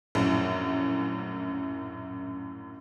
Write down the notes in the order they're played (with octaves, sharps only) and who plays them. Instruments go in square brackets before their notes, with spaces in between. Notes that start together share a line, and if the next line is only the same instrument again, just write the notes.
[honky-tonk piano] A#1 F#2 A2